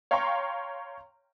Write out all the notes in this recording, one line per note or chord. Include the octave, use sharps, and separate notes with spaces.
C#5 F5 G5 A#5 C6 C#6